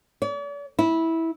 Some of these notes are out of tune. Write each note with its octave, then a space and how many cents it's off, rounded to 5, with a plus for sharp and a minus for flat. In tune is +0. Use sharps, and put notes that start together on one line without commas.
D5 -45
E4 -15